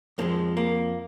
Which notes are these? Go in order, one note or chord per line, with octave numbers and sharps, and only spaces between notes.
F2 F3 G#3 A#3
A#3